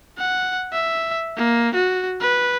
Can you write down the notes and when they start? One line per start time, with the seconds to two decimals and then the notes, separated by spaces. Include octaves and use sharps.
0.18 F#5
0.73 E5
1.37 A#3
1.75 F#4
2.21 B4